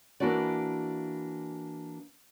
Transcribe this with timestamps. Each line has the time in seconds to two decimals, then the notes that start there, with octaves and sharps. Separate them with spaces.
0.20 E3 A#3 D4 E4 F#4 D5